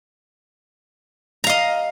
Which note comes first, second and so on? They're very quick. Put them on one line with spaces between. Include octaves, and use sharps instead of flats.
A#5 F5 D#5